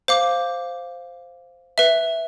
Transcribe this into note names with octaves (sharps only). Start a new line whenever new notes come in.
C5 F5 D6
B4 E5